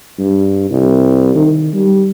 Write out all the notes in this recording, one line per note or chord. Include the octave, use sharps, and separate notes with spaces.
G2
C2
D#3
G3